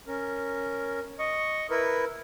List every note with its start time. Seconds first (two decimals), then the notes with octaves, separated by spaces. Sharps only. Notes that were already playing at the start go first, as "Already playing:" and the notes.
0.07 C#4 A#4
1.19 D#5 C#6
1.70 E4 A#4 B4